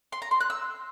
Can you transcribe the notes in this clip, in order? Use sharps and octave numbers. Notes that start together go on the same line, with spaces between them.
C6
A#5
C6
F#6
E6